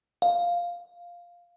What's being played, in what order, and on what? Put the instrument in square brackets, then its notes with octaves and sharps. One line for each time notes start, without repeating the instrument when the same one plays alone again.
[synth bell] F5